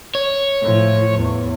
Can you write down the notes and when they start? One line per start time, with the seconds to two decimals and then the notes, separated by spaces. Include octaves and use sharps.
0.15 C#5
0.61 A2 F3
1.15 E2